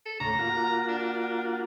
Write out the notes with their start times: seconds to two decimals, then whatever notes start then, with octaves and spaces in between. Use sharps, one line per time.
0.06 A4
0.20 D2 A2 C#3 A#5
0.39 A#3 F4 F#4
0.89 D4